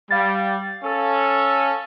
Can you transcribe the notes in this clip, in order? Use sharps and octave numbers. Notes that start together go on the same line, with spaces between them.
G3 F5 A6
C#4 A4